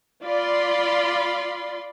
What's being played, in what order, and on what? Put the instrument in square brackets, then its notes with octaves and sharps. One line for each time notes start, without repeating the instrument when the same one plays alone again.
[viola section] F4 D5 B5 C6